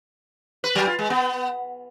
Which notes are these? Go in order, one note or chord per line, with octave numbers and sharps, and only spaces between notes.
B4
F#3
F4
G#3
B3